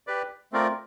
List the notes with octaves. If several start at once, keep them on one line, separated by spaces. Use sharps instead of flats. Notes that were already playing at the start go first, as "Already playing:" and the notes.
G4 B4 D5
A3 C4 F4 A#4 D5